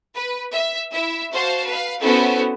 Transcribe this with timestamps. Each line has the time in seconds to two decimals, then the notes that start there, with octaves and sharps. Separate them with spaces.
0.15 B4
0.53 E5
0.93 E4 E5
1.33 F#4 C5 F5 A5
1.68 B4 F5
2.02 B3 C#4 E4 F#4 A4 C5